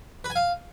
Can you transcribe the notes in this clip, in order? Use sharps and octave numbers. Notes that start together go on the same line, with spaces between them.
B4
G#5
F5